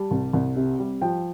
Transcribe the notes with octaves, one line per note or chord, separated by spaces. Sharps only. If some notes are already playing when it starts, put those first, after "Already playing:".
Already playing: G3 A5
C2
C2
C3
G3
F3 G5